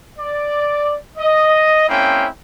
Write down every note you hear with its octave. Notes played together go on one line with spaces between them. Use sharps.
D5
D#5
G#3 A#3 C4 C#4 E4 G5